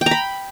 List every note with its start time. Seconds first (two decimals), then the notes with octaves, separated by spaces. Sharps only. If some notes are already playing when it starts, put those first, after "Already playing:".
0.01 G5
0.06 A#5
0.11 B5